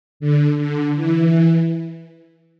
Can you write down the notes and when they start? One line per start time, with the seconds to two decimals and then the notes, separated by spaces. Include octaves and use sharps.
0.20 D3
0.58 D3
0.95 E3